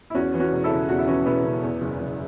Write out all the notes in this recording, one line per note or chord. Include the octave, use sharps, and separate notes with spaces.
E4
E2 C#4 F#4
E3
C#4 F#4
E1
E4 A4
C#3
E2 F#4
E4
E3 C#4 F#4
E1 B3 E4
C#3
E2
F#1
F#1